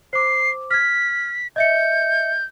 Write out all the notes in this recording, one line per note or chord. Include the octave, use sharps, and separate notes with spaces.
C5 D6 C7
F6 G#6 B6
D#5 E5 G6 C#7